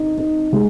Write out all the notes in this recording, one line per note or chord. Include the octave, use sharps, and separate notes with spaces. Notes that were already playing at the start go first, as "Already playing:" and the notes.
Already playing: D#4
D#4
G#3